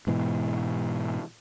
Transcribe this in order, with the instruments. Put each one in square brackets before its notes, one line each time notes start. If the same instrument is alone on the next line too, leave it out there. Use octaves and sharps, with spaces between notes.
[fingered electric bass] G#2 B2 E3